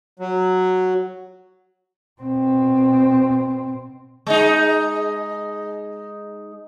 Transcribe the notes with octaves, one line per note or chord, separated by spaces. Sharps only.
F#3
B2 C4
G#3 D#4